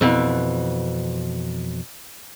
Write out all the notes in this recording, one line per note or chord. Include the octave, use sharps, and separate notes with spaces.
F2 B2 E3